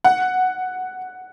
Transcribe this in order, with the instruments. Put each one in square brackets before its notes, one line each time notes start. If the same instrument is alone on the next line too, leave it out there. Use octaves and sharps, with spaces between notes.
[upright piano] F#5